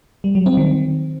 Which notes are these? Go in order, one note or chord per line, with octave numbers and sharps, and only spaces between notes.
G3
F#3
C4
D#3